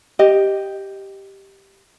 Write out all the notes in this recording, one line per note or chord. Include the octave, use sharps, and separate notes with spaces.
G4 D#5